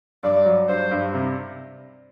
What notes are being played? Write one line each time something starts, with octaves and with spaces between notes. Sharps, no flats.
G2 D5
F#3
G2 C5
G2
C3